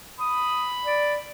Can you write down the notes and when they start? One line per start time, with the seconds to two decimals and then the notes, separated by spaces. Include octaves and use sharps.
0.20 B5 D#6
0.85 D5